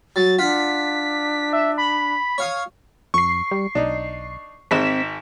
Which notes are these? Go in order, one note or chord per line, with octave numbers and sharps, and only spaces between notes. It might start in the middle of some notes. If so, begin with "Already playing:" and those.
F#3 A6
D4 F4 F#5 B6
E5
B5
C#5 F5 D#6
F2 C#6 C7
G3
B1 D4 D#4
G#1 G#2 C4 B6 E7